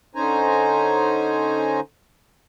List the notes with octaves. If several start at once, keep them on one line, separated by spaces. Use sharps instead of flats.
D3 C#4 D#4 C5 G#5 A#5